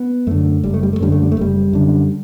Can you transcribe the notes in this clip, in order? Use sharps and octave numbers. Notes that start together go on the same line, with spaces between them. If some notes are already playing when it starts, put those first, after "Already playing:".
Already playing: B3
F#2 D3 A3
F#1 G3
A3
G3
A3
F#2 D3 G3
A3
G3
A3
F#1 G3
F#2 D3